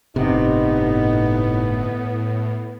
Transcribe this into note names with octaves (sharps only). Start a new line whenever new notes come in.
G1 A2 C3 B3 D#4